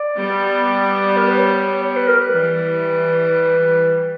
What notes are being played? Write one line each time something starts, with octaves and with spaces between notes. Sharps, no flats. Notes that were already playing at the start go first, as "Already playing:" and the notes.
Already playing: D5
G3 B3
A#4
B4
C#5
C#5
B4
A#4
B4
E3 G3